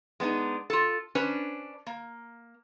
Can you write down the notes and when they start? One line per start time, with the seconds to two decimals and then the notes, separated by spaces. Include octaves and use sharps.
0.20 G#3 B3 D4 D#4
0.70 F4 A4
1.15 C#4 D4 B4 C5
1.87 A#3